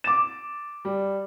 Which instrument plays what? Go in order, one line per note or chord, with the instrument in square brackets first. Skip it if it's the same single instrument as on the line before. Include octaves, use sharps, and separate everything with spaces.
[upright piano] D6 E7 [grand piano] A6
[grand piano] G3